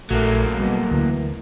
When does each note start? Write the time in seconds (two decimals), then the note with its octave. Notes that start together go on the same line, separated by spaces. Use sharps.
0.10 A#1 F#3 A3 A#3
0.59 B2 G3
0.91 D2 E3